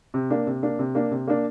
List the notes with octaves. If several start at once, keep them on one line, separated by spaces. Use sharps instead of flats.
C3
A#3 D4
C3
A#3 D4
C3
A#3 D4
C3
A#3 D4